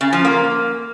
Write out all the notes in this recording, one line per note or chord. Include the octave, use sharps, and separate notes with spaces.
C#3
F3
A#3